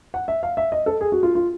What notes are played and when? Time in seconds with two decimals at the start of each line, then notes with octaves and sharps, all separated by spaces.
0.14 F#5
0.28 E5
0.43 F5
0.57 E5
0.72 D#5
0.86 A4
1.01 G#4
1.12 F#4
1.23 F4
1.35 F4